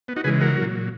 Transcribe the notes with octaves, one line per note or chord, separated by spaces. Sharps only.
B3
D#4 F#4
C#3 E3 G#3 G#4 B4
F#4 A#4
A#2 F#3